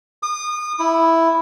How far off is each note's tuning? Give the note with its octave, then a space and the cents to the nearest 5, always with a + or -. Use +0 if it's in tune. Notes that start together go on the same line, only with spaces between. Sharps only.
D#6 -30
E4 -5